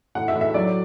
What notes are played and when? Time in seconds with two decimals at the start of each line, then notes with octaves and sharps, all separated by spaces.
0.15 A2 F#5
0.28 E5
0.35 A2
0.41 E5
0.54 F#3 D5